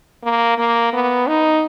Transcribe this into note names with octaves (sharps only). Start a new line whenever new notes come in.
A#3
A#3
B3
D#4